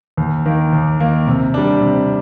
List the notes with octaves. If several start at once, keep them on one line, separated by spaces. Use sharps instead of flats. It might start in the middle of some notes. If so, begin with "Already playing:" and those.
D#2
D#3 A#3
D#2
D#3 A#3
C3
G3 D4
C3